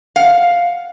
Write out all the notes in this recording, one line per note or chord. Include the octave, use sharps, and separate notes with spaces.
F5 F#5